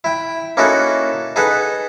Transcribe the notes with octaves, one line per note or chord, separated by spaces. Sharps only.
E4 G5
A#3 C#4 D#4 E4 F#4 A4
D#4 G#4 A4 B4 F#5